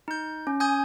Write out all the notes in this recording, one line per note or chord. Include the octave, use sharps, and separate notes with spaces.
D#4 G6
C#4
G#5 D#6 G6 G#6